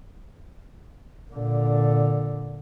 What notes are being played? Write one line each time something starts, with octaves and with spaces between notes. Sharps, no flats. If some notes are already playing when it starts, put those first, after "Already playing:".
A#2 D3